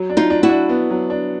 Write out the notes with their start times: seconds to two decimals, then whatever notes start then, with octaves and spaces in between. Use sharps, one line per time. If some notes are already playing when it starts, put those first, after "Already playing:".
Already playing: F#3
0.10 D4
0.17 D#4 F4
0.30 D4
0.43 E4 F#4
0.49 D4
0.69 B3
0.90 F#3
1.10 D4